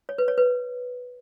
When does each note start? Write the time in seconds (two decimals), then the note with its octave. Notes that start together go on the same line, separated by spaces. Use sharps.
0.09 C#5
0.18 B4
0.28 C#5
0.38 B4